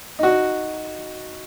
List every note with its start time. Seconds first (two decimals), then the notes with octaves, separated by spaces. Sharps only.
0.19 D#4 F#4